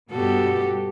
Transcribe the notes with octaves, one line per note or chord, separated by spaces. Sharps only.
G2 B2 B3 F#4 G4 A4